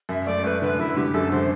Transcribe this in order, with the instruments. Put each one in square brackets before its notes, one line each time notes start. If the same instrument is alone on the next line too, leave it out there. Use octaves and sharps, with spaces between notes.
[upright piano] F#2 [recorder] E5
[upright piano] A3 [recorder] D5
[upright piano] A3 [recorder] B4
[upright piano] D3 [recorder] B4
[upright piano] F#2 [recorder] E4
[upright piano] D3 [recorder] G4
[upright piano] F#2 [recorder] A4
[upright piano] D3 [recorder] C5